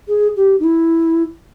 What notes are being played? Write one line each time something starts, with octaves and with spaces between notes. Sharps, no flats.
G#4
G4
D#4
E4